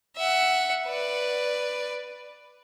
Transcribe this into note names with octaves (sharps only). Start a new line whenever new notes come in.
E5 F#5
B4 D5